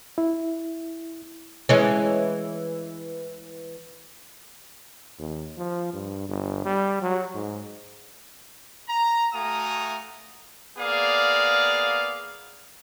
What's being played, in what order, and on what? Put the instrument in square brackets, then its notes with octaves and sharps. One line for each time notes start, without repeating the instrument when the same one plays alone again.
[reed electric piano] E4
[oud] E3 G#3 C#4
[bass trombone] D#2
F3
G2
G1
G3
F#3
G#2
[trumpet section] A#5
A3 F#4 F5 G#5 A#5 D#6
A#3 B3 G#4 D5 F5